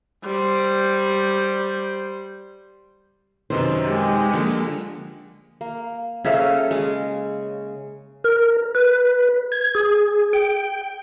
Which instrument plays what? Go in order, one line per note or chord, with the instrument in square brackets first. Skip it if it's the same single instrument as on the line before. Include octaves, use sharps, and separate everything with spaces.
[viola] G3 C5
[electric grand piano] F#2 C3 D#3 [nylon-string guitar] D#4 B4 C5
[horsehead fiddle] G#3 [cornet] G4
[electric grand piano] D3 F3 A#3
[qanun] A#3
[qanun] C#3 A#3 A4 [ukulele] C#4 E5 F5
[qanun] G#3
[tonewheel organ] A#4
B4
G#6
G#4
G5